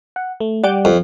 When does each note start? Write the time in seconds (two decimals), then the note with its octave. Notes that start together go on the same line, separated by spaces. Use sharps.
0.16 F#5
0.40 A3
0.64 G3 D5 F#5 G5
0.85 F2